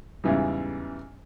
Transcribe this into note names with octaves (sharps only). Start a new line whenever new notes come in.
E2 G#2 C#3 E3 G3